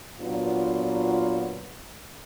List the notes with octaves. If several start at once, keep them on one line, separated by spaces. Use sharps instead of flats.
A#2 F#3 B3 D4 F4